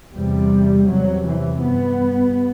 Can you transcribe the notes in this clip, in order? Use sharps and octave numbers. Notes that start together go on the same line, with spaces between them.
E2 C3 G3
E2 C3 F#3
E3
G2 B3